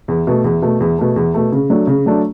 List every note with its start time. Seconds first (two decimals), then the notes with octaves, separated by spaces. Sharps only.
0.08 E2
0.27 B2 A3
0.44 E2
0.62 B2 A3
0.80 E2
0.99 B2 A3
1.16 E2
1.34 B2 A3
1.52 C#3
1.70 F#3 A3 D4
1.87 C#3
2.06 F#3 A3 D4